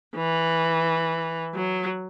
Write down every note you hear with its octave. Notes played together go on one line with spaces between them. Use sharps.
E3
F#3